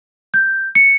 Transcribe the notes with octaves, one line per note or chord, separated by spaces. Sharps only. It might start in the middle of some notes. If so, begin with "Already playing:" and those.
G6
C#7